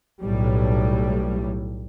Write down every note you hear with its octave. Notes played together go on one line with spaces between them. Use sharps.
B1 A2 G3